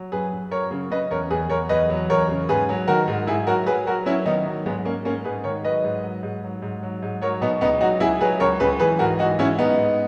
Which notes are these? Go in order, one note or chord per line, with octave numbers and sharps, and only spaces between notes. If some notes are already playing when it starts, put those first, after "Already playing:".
Already playing: F#3
F#2 G#4 B4
F#2
F#3 A#4 C#5
C#3
C#3 B4 D#5
E2 A#4 C#5
E2 G#4 B4
E2 A#4 C#5
E2 B4 D#5
F#3
E2 A#4 C#5
C#3
G#2 G#4 B4
F#3
D#3 F#4 A#4
G#2
G#2 E4 G#4
F#3 F#4 A#4
F#3 G#4 B4
F#3 F#4 A#4
F#3 C#4 E4
D#3 B3 D#4
F#3
G#2 G#3 B3
G#2 A#3 C#4
G#2 A#3 C#4
G#2 G#4 B4
D#3 A#4 C#5
F#3 B4 D#5
G#2
F#3
G#2
F#3
G#2
F#3
G#2
F#3 A#4 C#5
B2 B3 D#4
C#2 B3 D#4
F#3 D#4 F#4
C#2 E4 G#4
F#3 G#4 B4
C#2 A#4 C#5
C#2 G#4 B4
E3 G#4 B4
G#2 F#4 A#4
E3 D#4 F#4
G#2 C#4 E4
G#2 B3 D#4
G#2